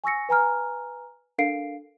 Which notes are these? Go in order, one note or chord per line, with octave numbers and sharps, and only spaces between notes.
G#5 C#6 E6 A#6 C#7
B4 G#5 A#5 F6
D4 A4 A#4 F5 C7 D7